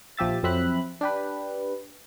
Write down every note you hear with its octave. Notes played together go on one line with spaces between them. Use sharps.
A#1 F3 G4 E5 A6
F2 F#3 C4 E5 B5 F#6
D4 G4 B4